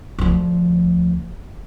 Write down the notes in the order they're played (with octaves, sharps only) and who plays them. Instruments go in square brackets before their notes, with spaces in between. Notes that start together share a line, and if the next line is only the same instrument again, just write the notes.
[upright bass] D2 F3